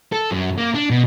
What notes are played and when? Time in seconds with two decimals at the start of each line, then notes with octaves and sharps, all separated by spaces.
0.13 A4
0.31 F#2
0.58 A#3
0.74 D4
0.90 B2